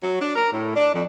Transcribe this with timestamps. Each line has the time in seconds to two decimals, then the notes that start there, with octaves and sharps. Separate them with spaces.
0.02 F#3
0.21 D4
0.36 A#4
0.53 A2
0.76 D4
0.94 F2